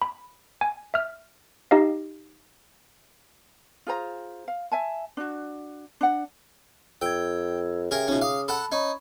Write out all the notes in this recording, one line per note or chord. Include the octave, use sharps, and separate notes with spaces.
B5
G#5
E5 F6
D#4 G4 D#5 F5
F4 G#4 C5 A#5
F5
E5 G#5 A5
D4 F#4
D4 F#5
F2 G5 E6 G#6
C#3 G4 G#4 A#4 E5 G5
B2 C#4 D#4 F4 E5
F5 D6 D#6
A4 F#5 A5 B5
C#4 D#4 B5 C#6 G#6